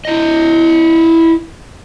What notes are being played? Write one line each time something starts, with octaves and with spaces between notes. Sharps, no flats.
E4 D#5